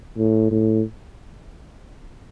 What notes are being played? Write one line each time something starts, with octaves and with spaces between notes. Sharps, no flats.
A2
A2